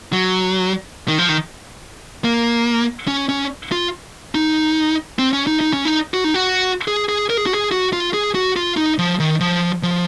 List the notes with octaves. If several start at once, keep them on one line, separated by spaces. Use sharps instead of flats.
F#3
D#3
F3
D#3
A#3
C#4
C#4
F4
D#4
C4
C#4
D#4
D#4
C#4
D#4
F#4
D#4
F#4
G#4
G#4
A#4
G#4
F#4
G#4
F#4
F4
G#4
F#4
F4
D#4
F3
D#3
F3
F3